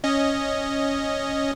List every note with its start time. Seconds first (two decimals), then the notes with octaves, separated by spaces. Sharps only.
0.04 C#4 D#5